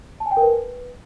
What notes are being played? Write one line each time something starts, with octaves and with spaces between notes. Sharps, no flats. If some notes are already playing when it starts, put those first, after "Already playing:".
A5
G#5
G5
A#4
B4